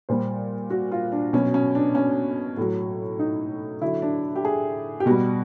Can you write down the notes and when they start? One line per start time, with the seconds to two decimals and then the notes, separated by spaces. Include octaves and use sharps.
0.09 A#2 G3 C5
0.70 F#4
0.92 F4
1.12 D4
1.33 B2 F#3 C#4
1.54 C#4
1.75 D4
1.95 C#4
2.57 A2 F#3
3.19 D#4
3.81 D3 F#3 E4
4.02 D4
4.36 G4
4.45 G#4
5.00 G4
5.06 B2 G3 F#4